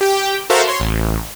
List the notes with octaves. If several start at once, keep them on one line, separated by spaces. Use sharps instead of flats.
G4 G5
F#4 A4 A#4 C5 E5 F5
C#5 C6
A1